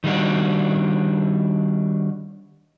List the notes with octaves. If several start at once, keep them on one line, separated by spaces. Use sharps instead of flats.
D#3 G3 D4 F#4